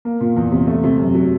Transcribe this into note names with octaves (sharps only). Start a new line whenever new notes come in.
A#3
A#2
E2
C3
A3
C3
F#2
F#3